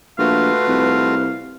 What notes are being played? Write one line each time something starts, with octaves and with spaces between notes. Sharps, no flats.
A#1 A3 F4 F#4 B4 F5
C2